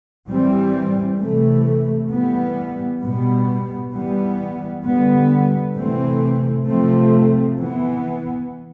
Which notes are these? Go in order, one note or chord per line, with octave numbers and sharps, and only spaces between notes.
E3 G3 C4
C3 E3 A3
E3 G3 B3
B2 G3 B3
E3 G3 B3
D3 G3 B3
C3 E3 A3 C4
C3 F3 A3 C4
E3 B3